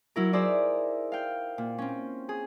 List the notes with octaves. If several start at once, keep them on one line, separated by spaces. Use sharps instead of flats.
F#3 E4 A#4
D#4 E4 G#4 C5 D5 E5
F5 G5
A#2
C4 C#4
G#4